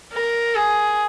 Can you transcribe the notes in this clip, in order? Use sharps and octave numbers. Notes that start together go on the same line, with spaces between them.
A#4
G#4